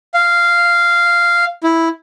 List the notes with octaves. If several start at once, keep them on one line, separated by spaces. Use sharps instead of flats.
F5
E4